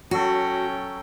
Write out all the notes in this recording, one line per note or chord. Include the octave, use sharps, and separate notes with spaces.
F#3 C#4 F#4 A4 G5